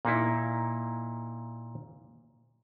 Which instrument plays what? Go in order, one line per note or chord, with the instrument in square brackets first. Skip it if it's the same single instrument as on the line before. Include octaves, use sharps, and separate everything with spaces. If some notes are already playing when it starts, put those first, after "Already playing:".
[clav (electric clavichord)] A#2 A#3 D#4 E4